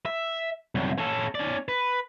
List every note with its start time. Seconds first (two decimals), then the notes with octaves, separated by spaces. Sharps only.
0.06 E5
0.75 C2 F#2
0.98 C#4 A4
1.35 C#4 D5
1.68 B4